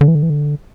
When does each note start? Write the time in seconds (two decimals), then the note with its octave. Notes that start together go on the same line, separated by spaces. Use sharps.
0.01 D3
0.08 E3
0.15 D3
0.23 E3
0.30 D3